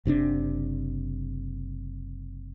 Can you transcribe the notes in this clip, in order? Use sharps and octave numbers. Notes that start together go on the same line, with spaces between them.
F#1 C3 C4 D4